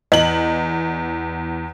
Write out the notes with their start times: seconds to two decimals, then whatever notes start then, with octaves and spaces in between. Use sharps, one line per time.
0.12 E2 D#5 F#7